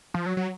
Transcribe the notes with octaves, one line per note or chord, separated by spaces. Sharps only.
F3
F#3
F#3